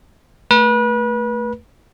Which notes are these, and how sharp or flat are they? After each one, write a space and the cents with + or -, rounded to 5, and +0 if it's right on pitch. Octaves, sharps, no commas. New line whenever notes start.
A3 +10 B4 -30